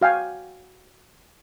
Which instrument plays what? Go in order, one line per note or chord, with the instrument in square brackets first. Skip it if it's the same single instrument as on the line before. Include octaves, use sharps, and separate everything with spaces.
[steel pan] F#4 F5 G5 G#5